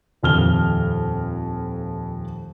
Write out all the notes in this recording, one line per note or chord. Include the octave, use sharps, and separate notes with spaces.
D#1 F2 F6 G7